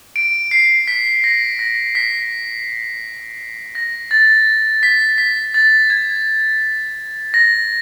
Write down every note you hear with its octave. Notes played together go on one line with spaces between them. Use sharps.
D7
C7
B6
A#6
A#6
B6
A#6
A6
B6
B6
A6
G#6
A#6